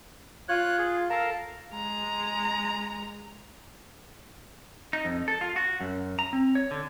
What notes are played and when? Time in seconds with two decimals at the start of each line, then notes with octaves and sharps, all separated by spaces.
0.49 F4 C#5 F#6
0.78 G#4
1.10 A4 A#4 F5 A5 A#5
1.72 G#3 A#5
4.93 D#4
5.05 F2
5.28 A4
5.41 F4
5.56 F#4
5.81 F#2
6.19 A#5
6.33 C4
6.55 C#5
6.71 D3